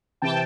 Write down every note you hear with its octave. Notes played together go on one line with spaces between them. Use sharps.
C3 E3 G5 A5